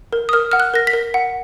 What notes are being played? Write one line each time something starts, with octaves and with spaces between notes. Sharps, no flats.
A#4
D#6
A#4 F6
F#5 F6
F#6
A#4 A#6
B6
A#4
F#5